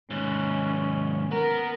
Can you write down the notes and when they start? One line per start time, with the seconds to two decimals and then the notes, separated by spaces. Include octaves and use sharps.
0.11 D#2 G#2 C#4
1.31 B3 A#4